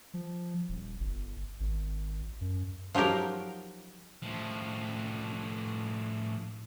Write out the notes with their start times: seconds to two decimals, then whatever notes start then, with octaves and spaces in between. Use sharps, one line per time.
0.14 F3
0.69 D#1
1.00 G1
1.60 G#1
2.41 F#2
2.94 F3 F#3 D#4 G4 A#4
4.22 A2 F3